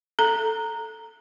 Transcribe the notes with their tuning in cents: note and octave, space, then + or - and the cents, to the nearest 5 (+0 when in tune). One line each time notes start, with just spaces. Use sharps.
A4 +0 A#5 -10